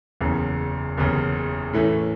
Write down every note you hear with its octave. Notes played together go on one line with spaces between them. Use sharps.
F#1 E2 C#3
F#1 E2 C#3
A2 E3 A3 C#4